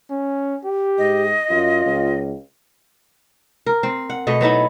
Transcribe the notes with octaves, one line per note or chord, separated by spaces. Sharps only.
C#4
G4
G#2 D#5
F#2 F4
C#2
A#4
C4
F#5
B2 A3 D#5
F#3 B3 D#4 E4